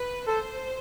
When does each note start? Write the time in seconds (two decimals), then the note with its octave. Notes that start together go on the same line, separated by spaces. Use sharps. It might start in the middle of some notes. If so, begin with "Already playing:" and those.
Already playing: B4
0.26 A4 C5